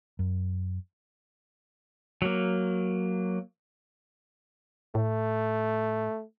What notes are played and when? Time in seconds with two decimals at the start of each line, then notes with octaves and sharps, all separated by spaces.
0.19 F#2
2.22 F#3 A#3
4.95 A2 A3